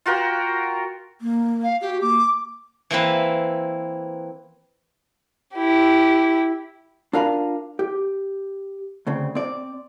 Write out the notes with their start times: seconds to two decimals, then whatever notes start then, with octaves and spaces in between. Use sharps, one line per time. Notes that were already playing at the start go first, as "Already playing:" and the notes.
0.06 F4 F#4 A#4 G5
1.21 A#3
1.63 F5
1.82 F#4 G4
2.01 A#3 D6
2.90 E3 A#3 C4 B4
5.54 E4 G4
7.13 D4 F4 A#4 F5 G#5 B5
7.79 G4
9.07 D2 C#3 C4
9.35 C4 D5